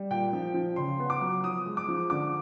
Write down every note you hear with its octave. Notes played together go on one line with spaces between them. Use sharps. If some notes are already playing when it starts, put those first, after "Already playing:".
Already playing: G3
A#2 G5
F3
F3
C#3 C6
B3
D6
F#3
F3 D#6
G#3
D6
F3
D3 D6